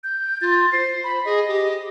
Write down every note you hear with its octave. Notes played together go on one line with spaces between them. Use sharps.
G6
F4 A6
C5 C7
B5
G#4 D#5
G4